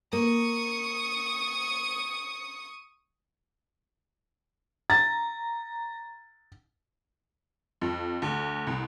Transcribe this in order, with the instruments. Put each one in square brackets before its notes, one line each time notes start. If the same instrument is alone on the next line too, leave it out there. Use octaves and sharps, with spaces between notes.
[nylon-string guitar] A#3 [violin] C#6 D#6
[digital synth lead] A#5 [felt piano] A6
[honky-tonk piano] F2
D2
C2